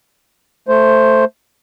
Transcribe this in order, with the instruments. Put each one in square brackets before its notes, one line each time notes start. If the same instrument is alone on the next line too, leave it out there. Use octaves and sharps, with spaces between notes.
[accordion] A3 C5